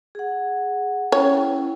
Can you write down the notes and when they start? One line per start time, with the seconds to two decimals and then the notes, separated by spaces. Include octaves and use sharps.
0.15 G#4 F#5
1.12 C#4 E4 C#5 G5